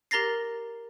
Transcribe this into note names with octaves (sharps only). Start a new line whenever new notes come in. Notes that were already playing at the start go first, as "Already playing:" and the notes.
G4 A#4 A#5 A6 A#6 C7